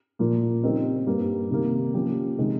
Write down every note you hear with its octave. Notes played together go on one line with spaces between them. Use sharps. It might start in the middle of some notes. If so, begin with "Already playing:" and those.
A#2 F3 A#3 F4
C#3 G3 C4 D#4 A#4
G2 G3 A#3
C3 D#3 G3 A#3
F3 A#3 C#4 G4
C3 D#3 G#3